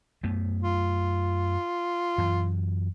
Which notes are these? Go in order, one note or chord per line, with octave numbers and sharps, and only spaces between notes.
F#2 A3 B3
F4
F#2 E3